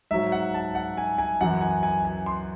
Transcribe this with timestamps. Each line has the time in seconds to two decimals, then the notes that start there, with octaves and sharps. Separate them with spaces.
0.11 G#2 F#3 E5
0.32 F#5
0.54 A5
0.75 F#5
0.97 G#5
1.18 G#5
1.41 F#2 E3 F#5
1.61 G#5
1.83 G#5
2.05 G#5
2.26 C6